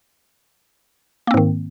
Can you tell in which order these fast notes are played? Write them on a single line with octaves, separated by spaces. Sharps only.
A#3 C4 G#2 D#3